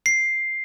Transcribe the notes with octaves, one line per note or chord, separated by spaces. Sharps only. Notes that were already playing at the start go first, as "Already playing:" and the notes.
C7